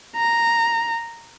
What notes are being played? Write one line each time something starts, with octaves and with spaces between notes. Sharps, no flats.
A#5